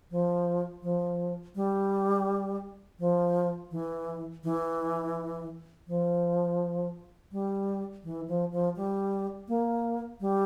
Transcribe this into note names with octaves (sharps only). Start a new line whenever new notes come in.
F3
F3
G3
F3
E3
E3
F3
G3
E3
F3
F3
G3
A#3
G3